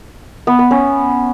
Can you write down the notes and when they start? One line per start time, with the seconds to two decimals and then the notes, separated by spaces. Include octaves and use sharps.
0.47 B3
0.59 B3
0.71 C#4